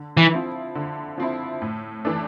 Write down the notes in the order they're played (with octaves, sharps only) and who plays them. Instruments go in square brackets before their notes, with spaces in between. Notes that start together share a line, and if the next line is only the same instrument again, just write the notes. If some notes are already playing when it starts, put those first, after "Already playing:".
Already playing: [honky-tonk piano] D3
[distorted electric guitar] E3
[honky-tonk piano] F3 C4 E4
D3
F3 C4 E4
A2
E3 A3 D4